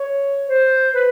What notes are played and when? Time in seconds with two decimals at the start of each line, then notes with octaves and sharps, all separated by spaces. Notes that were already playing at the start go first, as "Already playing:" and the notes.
Already playing: C#5
0.49 C5
0.94 B4